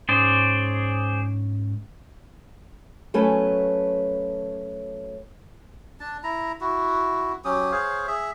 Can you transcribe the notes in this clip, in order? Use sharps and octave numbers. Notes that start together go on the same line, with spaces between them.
G#2 C#4 G#4 C5 D5
F#3 A3 C#4 B4
D4 A5
E4 A#5
E4 F#4
F#3 C#4 G4 D#6
G#4 C5 C#5 F5
G#4 E5